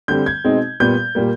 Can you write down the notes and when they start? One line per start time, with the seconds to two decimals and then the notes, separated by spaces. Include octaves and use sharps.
0.08 D3 G3 C4 G6
0.26 G#6
0.44 B2 G#3 C4 D#4
0.80 A#2 G3 B3 G6
1.15 A#2 G3 A#3